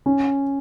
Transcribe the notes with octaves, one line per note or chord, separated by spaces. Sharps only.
C#4